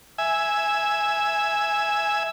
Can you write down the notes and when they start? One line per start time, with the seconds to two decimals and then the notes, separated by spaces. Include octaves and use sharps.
0.18 E5 G#5